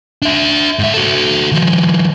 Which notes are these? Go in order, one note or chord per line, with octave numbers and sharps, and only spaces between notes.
D4 E5
G#2 E5
F#4 A4
D#3 F3